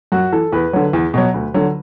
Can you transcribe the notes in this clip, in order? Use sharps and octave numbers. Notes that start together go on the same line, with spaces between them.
F#2 F#4
E3 A4
E2 B4
D3 F#3
E2
B2 F#3
D2
D3 F#3